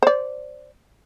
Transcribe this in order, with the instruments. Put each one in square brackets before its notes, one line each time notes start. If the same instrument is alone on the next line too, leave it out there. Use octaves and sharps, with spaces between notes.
[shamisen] C5 D5